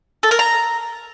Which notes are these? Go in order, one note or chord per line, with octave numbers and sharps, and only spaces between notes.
A4
A#4
A#5